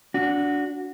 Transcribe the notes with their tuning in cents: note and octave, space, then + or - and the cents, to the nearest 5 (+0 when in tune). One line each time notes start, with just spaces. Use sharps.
D4 -20 F#4 -5